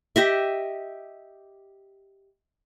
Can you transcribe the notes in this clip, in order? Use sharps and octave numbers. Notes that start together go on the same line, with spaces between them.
G4 D#5 E5